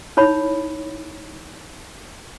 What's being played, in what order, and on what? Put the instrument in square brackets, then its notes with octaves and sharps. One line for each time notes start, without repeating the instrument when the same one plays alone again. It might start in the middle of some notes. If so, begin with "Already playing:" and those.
[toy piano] D#4 E4 C#5 B5